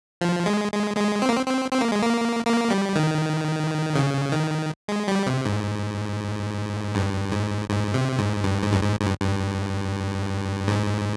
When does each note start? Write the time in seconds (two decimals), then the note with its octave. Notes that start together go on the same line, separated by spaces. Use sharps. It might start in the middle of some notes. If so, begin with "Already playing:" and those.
0.21 F3
0.46 G#3
0.72 G#3
0.97 G#3
1.22 C4
1.29 A#3
1.36 C4
1.47 C4
1.71 C4
1.81 A#3
1.92 G#3
2.02 A#3
2.46 A#3
2.70 G3
2.96 D#3
3.95 C#3
4.32 D#3
4.88 G#3
5.08 G3
5.26 C3
5.45 G#2
6.95 G2
7.32 G#2
7.69 G#2
7.94 C3
8.18 G#2
8.44 G2
8.63 G#2
8.72 G2
8.81 G#2
9.00 G#2
9.06 G2
9.21 G2
10.68 G#2